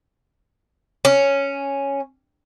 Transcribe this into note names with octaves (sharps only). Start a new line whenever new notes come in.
C#4